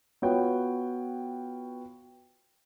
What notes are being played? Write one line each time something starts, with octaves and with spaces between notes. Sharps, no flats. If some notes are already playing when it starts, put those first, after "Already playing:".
B3 F4 F#4 C#5 G5